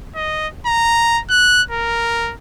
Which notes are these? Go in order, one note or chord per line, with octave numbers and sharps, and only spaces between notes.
D#5
A#5
F#6
A#4